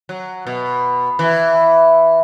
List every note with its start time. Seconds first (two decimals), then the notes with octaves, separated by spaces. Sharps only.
0.09 F#3
0.47 B2
1.19 E3